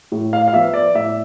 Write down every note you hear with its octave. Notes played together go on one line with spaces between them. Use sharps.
A2
F5
F5
F3 B3 E5
D5
A2 E5